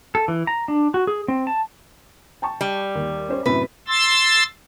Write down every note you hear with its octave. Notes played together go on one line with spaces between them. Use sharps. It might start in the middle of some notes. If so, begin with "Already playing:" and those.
A4
E3
A#5
D4
F#4
G#4
C4
A5
G5 A5 C#6
G3
D#2
C#4 C5 C#5
F#2 A2 C3 B4
C6 E6 A6